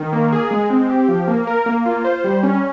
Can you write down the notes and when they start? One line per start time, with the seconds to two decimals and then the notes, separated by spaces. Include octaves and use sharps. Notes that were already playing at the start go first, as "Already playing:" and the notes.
Already playing: D#3
0.13 A#3
0.32 G#4
0.51 G#3
0.70 C4
0.90 G4
1.08 F3
1.28 A#3
1.47 A#4
1.66 A#3
1.86 F4
2.05 C5
2.24 G3
2.43 C#4